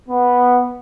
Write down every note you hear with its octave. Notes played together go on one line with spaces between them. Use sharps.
B3